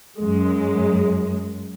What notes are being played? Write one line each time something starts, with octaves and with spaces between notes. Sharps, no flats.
F#2 G#3